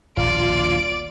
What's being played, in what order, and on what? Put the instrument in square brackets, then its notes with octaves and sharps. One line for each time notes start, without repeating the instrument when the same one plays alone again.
[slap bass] D#1 A#1 B2 [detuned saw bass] F4 [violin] D5 D7